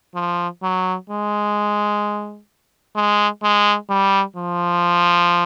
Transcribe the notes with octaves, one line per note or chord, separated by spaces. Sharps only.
F3
F#3
G#3
G#3
G#3
G3
F3